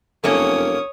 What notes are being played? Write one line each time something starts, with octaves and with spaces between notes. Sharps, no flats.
F1 F#2 A#3 C#4 A4 C#5 D#6